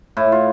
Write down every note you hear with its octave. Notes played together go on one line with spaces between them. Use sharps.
A2 E4
F4